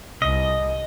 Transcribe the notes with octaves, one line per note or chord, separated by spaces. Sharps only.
C2 D#5